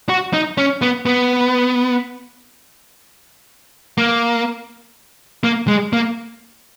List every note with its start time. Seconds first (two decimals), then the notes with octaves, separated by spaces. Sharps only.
0.09 F#4
0.33 D#4
0.58 C#4
0.82 B3
1.06 B3
3.98 A#3
5.44 A#3
5.67 G#3
5.93 A#3